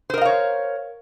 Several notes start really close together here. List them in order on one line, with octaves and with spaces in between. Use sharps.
C5 A#4 D#5 F5 C#5